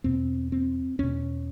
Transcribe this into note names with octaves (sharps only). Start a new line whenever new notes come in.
E2 B2 C4
C4
E2 B2 C#4